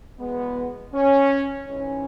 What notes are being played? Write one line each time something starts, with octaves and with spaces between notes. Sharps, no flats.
E2 B2 G#3 B3
C#4
G#2 E3 G#3 C#4